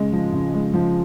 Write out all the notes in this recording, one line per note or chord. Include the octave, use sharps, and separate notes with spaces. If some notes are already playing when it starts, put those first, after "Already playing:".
Already playing: C#3 G#3
F3
C#3
G#3
F3